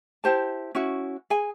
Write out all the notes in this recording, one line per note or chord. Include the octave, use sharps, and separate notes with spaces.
E4 G4 C5 A5
C#4 E4 F#4
G#4 G#5